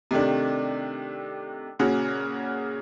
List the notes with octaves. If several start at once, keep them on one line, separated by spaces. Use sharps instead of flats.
C3 D#3 A3 D4
A#2 C#3 C#4 F#4